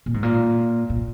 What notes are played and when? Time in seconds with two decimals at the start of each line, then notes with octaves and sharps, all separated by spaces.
0.06 A#2
0.14 G#2
0.23 A#2
0.90 A#2